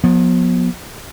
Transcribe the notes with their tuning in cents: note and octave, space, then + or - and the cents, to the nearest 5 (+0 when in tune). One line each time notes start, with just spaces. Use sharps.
F3 +40 B3 -20